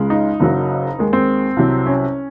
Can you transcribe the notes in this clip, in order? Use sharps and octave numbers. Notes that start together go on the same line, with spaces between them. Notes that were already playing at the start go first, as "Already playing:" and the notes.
Already playing: C#2 C#3 G#3
D#4
F#1 F#2 C#3 F#3
D#2 D#3 G#3
C4
C2 C3 F#3
C#4